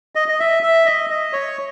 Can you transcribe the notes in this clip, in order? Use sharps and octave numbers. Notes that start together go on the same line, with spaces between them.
D#5
D#5
E5
E5
D#5
D#5
C#5